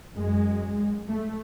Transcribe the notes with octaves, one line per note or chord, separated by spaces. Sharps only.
F#2 G#3
A3